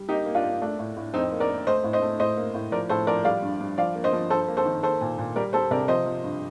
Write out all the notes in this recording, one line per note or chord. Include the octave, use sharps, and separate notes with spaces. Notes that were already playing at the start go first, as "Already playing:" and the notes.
Already playing: G3
A#3 D#4 G4
A#3
D4 F4
A#3
A3 D4
A2
A2
F2 C4 D#4
A#3
A#4 D5
A#3
A3 C5 D#5
A2
C5 D#5
A3
A2 C5 D#5
A#3
A2
F3 A#4 D5
A2 A4 C5
F3 A#4 D5
G3 D5 F5
G2
G2
F3 D5 F5
A#3
C5 D#5
F3
G2 A4 C5
A#3
A4 C5
D#3
A#3 A4 C5
A#2
A#2
G3 A#4 D5
G3 A4 C5
C3 A#4 D5
F3 C5 D#5
F3
G2